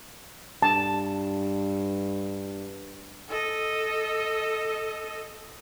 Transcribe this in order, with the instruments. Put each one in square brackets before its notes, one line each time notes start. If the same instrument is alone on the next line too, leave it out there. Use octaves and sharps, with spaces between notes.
[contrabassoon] G2 [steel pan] A5
[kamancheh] A4 D#5